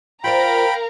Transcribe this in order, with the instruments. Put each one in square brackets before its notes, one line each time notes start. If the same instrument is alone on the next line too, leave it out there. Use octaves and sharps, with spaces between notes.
[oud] F4 C5 D5 [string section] A#4 F5 A#5 [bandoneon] G5 B5